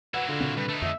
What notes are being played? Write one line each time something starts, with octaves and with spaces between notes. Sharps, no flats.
F#3 E4 B4 F#5
D3 F4
A#2 C#3 C4
G2 B4
A3 D#4
F2 D3 E5